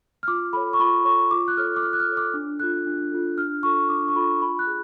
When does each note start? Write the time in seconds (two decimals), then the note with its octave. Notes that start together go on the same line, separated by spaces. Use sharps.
0.23 F6
0.28 F4 D6
0.53 A4 C#5 B5
0.73 C#6
0.79 F4 B5
1.05 A4 C#5 C#6
1.31 F4 D6
1.48 F#6
1.57 A4 C#5 F6
1.76 D6
1.82 F4 F6
1.93 F#6
2.00 F6
2.08 A4 C#5
2.17 D6
2.34 D4
2.60 F4 A4 F#6
2.87 D4
3.11 F4 A4
3.38 D4 F6
3.63 F4 A4 C#6
3.89 D4 D6
4.08 C#6
4.16 F4 A4 B5
4.41 F4 B5
4.59 F#6
4.67 G#4